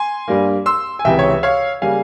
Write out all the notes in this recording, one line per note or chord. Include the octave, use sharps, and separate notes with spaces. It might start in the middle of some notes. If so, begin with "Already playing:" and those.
Already playing: G#5 C6
G2 G3 A#3
C6 E6
G#5
C#2 C3 E3 E5 G5
C#5
E5
C#5 F5
C#3 G3 A#3 F5 G#5